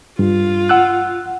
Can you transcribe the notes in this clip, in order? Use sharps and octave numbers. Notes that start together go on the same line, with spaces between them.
G2 F4
F#5 E6 F#6